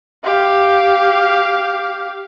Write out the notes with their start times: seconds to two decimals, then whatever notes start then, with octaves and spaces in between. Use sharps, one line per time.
0.24 G4 F5